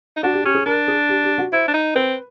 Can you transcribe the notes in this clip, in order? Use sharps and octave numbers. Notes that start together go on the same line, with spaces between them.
D#4
D4 F#4
G4
C#4 G4
G#4
D4 A#4
G#4
G4
G4
F#4
E4 C5
D4
D#4
C4 B4